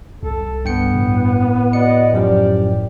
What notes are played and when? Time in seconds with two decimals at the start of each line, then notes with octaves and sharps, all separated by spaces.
0.23 C2 A4
0.65 G2 B3 G5 C#7
0.94 A2
1.73 F#4 D5 D#5 C#7
2.13 F#2 F3 G4 A#4 D5